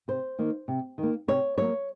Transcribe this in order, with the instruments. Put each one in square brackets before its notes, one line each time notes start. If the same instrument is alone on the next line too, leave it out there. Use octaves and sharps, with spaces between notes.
[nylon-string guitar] C3 C5
D#3 A#3
C3
D#3
A#3
C3 C#5
F#3 A#3 C#5